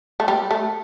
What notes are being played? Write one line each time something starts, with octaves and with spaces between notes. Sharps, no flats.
A3
G3
A3